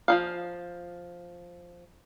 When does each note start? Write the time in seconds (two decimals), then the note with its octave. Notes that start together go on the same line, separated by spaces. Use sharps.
0.08 F3 F#3 F5